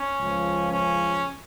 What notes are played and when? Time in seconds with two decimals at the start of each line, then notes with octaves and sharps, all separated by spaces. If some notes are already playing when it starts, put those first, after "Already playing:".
Already playing: C#4
0.20 C#2 C#3 F3
0.71 C#4